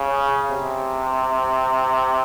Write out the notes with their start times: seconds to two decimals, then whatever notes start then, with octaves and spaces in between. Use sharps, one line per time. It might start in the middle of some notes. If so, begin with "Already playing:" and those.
Already playing: C#3
0.51 C3